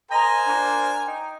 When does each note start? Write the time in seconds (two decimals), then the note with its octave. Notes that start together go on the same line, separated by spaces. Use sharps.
0.11 A#4 C5 D#5 G#5 A#5
0.46 F3 A#3 D4
1.06 D#4 G5